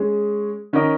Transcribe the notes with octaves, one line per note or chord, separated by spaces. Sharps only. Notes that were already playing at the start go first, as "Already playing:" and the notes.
Already playing: G#3 C#4 G#4
D#3 C#4 A#4 D#5